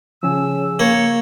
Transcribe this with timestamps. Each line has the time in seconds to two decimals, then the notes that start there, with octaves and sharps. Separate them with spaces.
0.23 C#3 F3 C#4 G#5 E6
0.80 A#3 C#5